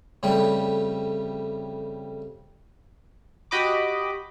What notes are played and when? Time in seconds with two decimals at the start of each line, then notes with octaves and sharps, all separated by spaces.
0.23 F2 C#3 G3 A3 G4 C#5
3.51 F#4 G4 D#5 B5 D6